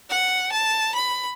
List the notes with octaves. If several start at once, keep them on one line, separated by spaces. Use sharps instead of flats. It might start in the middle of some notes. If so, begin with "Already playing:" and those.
F#5
A5
B5